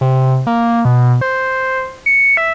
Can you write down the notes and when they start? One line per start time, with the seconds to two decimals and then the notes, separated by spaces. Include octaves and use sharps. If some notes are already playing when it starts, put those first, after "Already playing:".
0.01 C3
0.47 A#3
0.85 B2
1.21 C5
2.06 C#7
2.37 E5